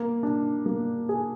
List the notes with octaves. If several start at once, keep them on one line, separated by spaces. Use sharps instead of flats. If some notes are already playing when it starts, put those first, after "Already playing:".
Already playing: A#3
D4
A#3
G#4